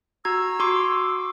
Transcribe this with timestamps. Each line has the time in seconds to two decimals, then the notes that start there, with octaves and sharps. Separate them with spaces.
0.25 F#4 A#5 E6 G#6
0.60 F#4 C6 D6